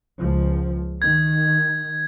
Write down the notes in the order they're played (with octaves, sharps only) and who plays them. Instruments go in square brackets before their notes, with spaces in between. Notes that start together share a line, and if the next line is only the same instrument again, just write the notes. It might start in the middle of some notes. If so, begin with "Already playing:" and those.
[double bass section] C#2 F3
[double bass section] D#3 [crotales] G#6